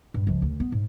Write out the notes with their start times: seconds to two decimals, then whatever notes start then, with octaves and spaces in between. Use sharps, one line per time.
0.14 G2
0.27 C#2 F3
0.42 D2
0.60 B3
0.72 G#2